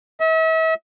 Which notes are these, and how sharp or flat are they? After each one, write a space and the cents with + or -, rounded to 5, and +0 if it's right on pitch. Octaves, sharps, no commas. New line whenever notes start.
E5 -40